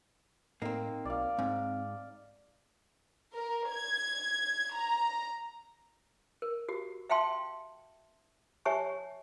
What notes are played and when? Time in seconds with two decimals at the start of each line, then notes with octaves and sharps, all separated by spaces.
0.62 A2 A#3 C4 D#4
1.05 B1 D5 F5
1.39 G#2 C4
3.34 A#4
3.70 G#6
4.75 A#5
6.42 A#4
6.69 F#4 G4
7.10 E5 F5 G5 A5 C6
8.65 G4 C#5 E5 G#5 A5 C#6